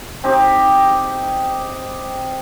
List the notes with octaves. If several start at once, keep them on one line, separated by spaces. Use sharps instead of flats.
C4 D#4 G4